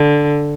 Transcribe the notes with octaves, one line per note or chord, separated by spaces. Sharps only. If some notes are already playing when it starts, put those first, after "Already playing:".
Already playing: D3